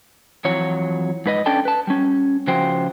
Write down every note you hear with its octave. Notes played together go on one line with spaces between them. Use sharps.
F2 E3 F#3 C#5
G#2 B4 D#5
C#4 D4 A4 D5 G5 A5
B4 A5
G3 C#4
C#3 F3 F#4 C5 G5